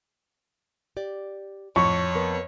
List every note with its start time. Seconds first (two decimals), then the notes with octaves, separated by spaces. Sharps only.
0.97 G4 D5
1.76 F2 A2 C#5 C#6
2.14 B3 A#4 B4